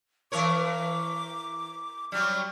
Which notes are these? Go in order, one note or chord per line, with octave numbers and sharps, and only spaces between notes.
E3 A#4 C#5 D6
F#3 G3 F6